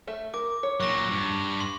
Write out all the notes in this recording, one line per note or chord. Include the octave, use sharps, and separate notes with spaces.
A3 A4 E5
A#4 D6
C#5
A#2 F#3 C#6 A#6
G2
C6